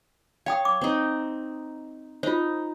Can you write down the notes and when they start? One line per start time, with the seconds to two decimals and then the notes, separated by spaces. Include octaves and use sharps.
0.46 C#5 F5 G5 D#6
0.65 D6
0.81 C4 D#4
2.23 D#4 F4 C5